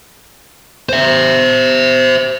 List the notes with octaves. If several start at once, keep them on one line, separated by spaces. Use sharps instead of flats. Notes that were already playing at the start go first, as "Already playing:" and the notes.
C5 E5